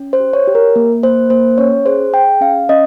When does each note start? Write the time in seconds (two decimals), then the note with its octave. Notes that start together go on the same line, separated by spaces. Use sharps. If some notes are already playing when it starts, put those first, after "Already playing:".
Already playing: C#4
0.13 C5
0.20 G4
0.33 C#5
0.48 G4
0.55 A#4
0.76 A#3
1.03 A#3 C5
1.30 A#3 C5
1.58 C#4 C#5
1.86 G#4 C5
2.13 G#4 G5
2.41 C#4 F5
2.69 C#4 D#5